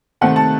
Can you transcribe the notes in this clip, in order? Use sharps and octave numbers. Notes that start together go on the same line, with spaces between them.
C3 D#3 A3 C4 F#5
A5